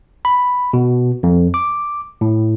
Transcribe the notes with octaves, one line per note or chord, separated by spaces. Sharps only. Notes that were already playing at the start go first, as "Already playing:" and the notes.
B5
B2
F2
D6
A2